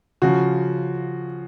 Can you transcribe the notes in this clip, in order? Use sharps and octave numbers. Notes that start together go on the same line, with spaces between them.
C#3 F3 F#4